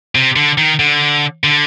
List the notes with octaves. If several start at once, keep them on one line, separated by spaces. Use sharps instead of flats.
C3
D3
D#3
D3
D3